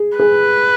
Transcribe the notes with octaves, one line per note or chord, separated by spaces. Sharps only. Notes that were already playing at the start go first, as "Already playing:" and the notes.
Already playing: G#4
G#4 B4